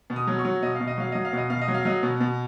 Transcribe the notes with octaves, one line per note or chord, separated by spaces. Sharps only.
B2
D#6
F#3
C#6
F#3
B2 D#5
F5
B2
D#5
F#3 F5
F#3 D#5
F5
B2 D#5
B2 F5
D#5
F#3
F5
F#3 D#5
B2
B2